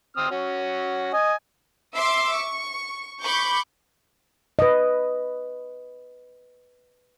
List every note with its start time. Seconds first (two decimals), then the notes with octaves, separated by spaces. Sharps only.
0.17 C4 D#6 F6
0.31 C#4 F#4
1.13 D#5 G#5
1.95 E5 C6 D6 E6
2.33 C#6
3.24 B5 C#6 D6 G6
4.59 B4 D#5